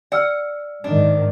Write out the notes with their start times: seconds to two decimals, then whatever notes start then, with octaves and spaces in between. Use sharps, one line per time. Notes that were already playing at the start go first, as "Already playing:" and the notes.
0.12 D5 F#5 E6 F6
0.84 G#2 D#3 D4